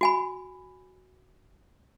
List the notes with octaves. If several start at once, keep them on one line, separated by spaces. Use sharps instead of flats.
F#4 G#5 B5